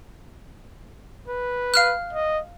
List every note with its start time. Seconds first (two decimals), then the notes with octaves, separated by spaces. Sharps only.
1.28 B4
1.74 F5 F6 F#6
2.13 D#5